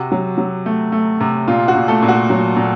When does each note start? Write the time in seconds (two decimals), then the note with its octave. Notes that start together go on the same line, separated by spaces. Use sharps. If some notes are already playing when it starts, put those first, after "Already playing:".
Already playing: C3 F#4
0.12 F#3
0.38 F#3
0.66 A3
0.92 A3
1.21 C3
1.48 A#2 F4
1.68 F#4
1.75 A#2
1.88 A3 A4
2.02 A#2
2.08 F#4
2.30 F#3
2.56 A#2